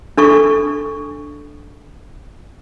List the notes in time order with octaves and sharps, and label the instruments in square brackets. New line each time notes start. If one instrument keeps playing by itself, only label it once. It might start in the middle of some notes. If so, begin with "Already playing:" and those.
[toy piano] D4 A4 C#6